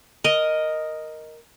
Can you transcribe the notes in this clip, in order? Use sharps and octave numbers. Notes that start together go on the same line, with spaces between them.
A#4 D#5